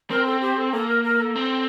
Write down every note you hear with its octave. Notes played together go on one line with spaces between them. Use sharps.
C4 A#4
A4
G4
A4
A#3 A4
A#4
A#4
A4
C4